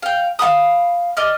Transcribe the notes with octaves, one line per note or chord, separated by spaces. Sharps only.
F5 G5
F5 F#5 B5 D#6
D5 D#5 F6